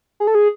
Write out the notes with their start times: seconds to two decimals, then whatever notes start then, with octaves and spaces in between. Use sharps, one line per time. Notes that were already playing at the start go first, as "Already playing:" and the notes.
0.20 G#4
0.27 A4
0.35 G#4